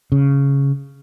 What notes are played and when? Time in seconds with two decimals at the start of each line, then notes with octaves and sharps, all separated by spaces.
0.12 C#3